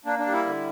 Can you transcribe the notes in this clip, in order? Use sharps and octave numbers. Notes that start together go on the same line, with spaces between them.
A#3 D4
D4
G3
E4
D3